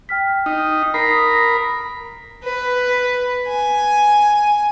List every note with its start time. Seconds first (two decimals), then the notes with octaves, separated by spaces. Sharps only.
0.09 G5 F6 B6
0.46 D#4
0.94 A#4 B5 D#6 A#6 C7
2.44 B4
3.48 G#5